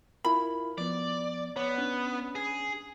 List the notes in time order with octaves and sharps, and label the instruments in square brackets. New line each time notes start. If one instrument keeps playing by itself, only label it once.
[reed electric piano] E4 F4 A#4 [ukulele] B5
[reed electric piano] F3 B3 [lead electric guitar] D5
[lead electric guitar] B3 [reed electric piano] C#5
[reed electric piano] C#4 D4
[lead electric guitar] G#4